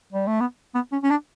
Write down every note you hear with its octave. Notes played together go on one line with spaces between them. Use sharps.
G3
A3
B3
B3
C#4
C#4
D4